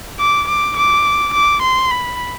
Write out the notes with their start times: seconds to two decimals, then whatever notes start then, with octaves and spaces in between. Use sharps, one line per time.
0.19 D6
0.48 D6
0.77 D6
1.34 D6
1.62 C6
1.91 B5